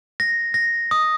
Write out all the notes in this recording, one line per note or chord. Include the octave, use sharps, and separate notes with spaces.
A#6
A#6
D#6